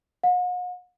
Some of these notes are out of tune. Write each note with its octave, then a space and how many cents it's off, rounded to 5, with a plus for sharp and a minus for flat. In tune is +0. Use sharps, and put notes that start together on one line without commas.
F#5 -45